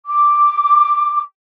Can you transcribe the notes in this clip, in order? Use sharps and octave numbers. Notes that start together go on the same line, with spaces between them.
D6